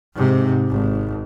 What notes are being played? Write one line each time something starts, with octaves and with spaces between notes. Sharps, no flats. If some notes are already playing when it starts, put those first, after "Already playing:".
G#2 C3
G#1